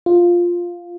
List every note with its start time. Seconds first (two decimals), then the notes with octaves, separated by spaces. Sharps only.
0.06 F4